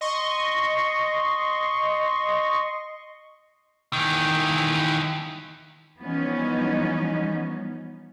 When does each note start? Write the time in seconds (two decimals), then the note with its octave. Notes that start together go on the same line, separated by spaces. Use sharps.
0.01 D#5 C6 C#6
3.93 D#3 E3
6.01 E3 F3 G3 B3 C#4 D#4